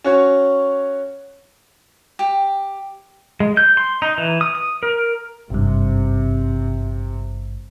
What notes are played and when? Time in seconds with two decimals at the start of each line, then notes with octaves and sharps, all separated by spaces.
0.04 C#4 F#4 C#5
2.19 G4
3.40 G#3
3.57 G6
3.77 C6
4.02 D#4
4.18 E3
4.41 D#6
4.55 D#6
4.83 A#4
5.50 G#1 G2 C3